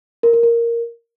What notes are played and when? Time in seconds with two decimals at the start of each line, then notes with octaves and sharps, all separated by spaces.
0.23 A#4
0.33 A#4
0.43 A#4